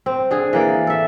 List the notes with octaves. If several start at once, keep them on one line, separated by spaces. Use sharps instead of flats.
C4
D3 G#4
E3 A#3 D5
A4 E5